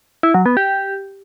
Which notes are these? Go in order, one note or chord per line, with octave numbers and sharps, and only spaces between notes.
E4
F#3
B3
G4